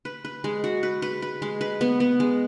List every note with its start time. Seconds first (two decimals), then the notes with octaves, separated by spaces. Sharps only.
0.05 B4
0.25 B4
0.44 G#3
0.64 F#4
0.83 B4
1.02 B4
1.22 B4
1.42 G#3
1.61 B4
1.81 B3
2.00 B3
2.20 G#3